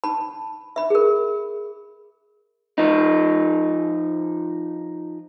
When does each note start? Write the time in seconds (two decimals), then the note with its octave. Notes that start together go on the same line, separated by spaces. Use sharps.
0.04 A5 B5
0.76 E5 B5
0.90 G#4 A#4
2.78 F3 D#4